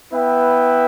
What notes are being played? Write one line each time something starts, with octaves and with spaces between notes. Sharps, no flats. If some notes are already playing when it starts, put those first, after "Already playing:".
B3 E4 B4 E5 G5